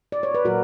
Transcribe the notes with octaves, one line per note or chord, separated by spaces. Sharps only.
D5
C#5
B4
A#2 F#3 F#4 A#4